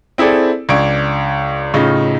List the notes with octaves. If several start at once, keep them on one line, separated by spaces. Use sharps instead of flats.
C4 E4 G#4 A4 D5
C#2 D4 C#6 G#6 D7
A2 C#3 D#4 F4